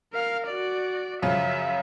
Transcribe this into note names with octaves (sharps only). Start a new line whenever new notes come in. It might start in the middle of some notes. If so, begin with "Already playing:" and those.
A#4 F5
F#4 D5
F#2 C#3 F3 E5